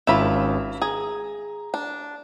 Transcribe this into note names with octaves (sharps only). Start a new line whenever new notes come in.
G#1 C#4 E4 F4 B5 E7
G#4 A#5
D4